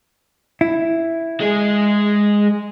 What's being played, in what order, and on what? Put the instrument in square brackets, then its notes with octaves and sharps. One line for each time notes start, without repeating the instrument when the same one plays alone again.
[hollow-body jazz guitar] E4
[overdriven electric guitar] G#3 G#4